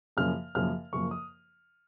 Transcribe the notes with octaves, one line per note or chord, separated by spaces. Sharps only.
F#2 C#3 F3 A#3 F6
F#2 C#3 F3 A#3 F6
F#2 C#3 F3 A#3 C#6
D#6